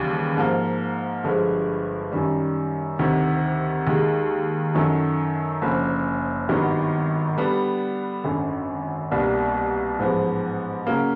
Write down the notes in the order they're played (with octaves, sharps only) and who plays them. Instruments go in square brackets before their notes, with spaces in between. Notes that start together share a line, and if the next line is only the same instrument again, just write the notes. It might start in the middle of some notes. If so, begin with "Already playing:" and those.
Already playing: [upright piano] D#2 C#3 E3 G3
G#2 F3 A#3
G1 G2 D3 F3 G#3
F#2 D#3 G3
D2 C3 D#3
D#2 D#3 G#3
F#2 D#3 F#3 A3
F#1 F#2 D3 F3
G#1 G2 D#3 F#3 B3
D3 G3 B3 D4
G#1 F#2 D3
C2 B2 G3 A#3 D4
A1 G#2 F3 G#3 B3
C#3 F#3 A#3